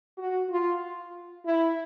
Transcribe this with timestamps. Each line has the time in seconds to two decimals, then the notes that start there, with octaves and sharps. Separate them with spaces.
0.18 F#4
0.50 F4
1.46 E4